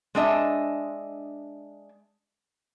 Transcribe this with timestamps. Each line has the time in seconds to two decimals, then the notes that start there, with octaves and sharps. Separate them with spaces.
0.15 G#3 D4 D#5 E5